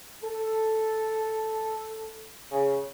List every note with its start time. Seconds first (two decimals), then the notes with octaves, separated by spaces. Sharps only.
0.23 A4
2.51 C#3